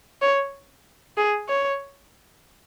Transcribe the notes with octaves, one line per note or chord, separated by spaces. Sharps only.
C#5
G#4
C#5